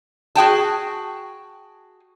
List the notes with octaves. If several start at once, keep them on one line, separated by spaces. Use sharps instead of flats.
F#4 G#4 G5 A5